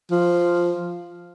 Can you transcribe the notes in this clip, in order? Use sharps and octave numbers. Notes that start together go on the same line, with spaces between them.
F3